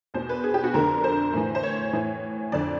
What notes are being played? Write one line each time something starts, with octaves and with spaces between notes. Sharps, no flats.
E2 B2 C5
B4
G#4
G4
F#4
F2 D3 A#4
C5
A2 E3
C5
C#5
A2 E3
F2 D3 D5